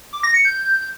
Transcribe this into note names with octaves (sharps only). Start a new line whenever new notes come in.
D6
A#6
C#7
G6